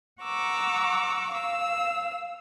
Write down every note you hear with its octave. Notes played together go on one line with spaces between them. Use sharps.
F#5 A#5 C#6 D6 E6
F5 E6